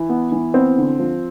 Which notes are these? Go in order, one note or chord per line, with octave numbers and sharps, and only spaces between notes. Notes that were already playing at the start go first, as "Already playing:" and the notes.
Already playing: E3 E4
B3
E3
B3 C4
D3
F3